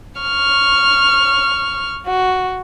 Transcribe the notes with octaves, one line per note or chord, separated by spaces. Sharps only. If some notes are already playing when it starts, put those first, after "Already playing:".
C#6 F6
F#4